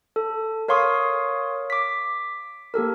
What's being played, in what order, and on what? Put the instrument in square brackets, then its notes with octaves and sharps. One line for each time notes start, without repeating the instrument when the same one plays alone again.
[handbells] A4
A#4 C#5 F5 C6 C#6 D#6
D6 B6
A#3 G4 A4 A#4